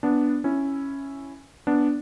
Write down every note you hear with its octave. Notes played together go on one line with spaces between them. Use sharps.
B3 D4
C#4 E4
B3 D4